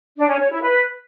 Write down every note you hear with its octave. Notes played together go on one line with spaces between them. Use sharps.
D4
C#4
C#5
E4
B4